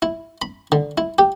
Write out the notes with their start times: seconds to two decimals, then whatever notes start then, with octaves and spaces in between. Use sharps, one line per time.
0.02 E4
0.42 B5
0.72 D3
0.98 E4
1.19 G4